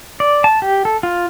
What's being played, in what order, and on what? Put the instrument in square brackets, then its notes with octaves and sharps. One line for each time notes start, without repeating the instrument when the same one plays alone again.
[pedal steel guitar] D5
A5
G4
A4
F4